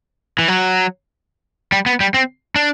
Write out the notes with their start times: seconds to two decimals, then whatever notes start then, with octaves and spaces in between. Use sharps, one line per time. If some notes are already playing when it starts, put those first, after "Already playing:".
0.39 E3
0.48 F#3
1.72 G3
1.86 B3
2.00 G3
2.14 C4
2.56 D4